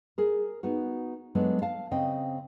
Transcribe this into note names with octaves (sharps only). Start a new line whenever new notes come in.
G#4 A#4
B3 D#4 F#4
F#3 G#3 A3 B3 D4
F5 A5
C#3 C4 D#5 G5